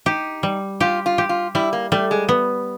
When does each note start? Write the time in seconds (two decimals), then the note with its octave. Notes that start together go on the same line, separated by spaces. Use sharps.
0.06 D#4 G4
0.43 G3
0.80 F4 G4
1.06 F4
1.18 G4
1.29 F4
1.55 G3 E4
1.73 A#3
1.92 G3 A3
2.11 G#3
2.29 B3